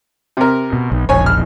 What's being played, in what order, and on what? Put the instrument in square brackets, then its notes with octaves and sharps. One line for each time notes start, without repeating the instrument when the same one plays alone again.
[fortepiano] C3 A#4
[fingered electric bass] B2
B1
[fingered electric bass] E1 A#1 [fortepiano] C#5 G#5
[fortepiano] F6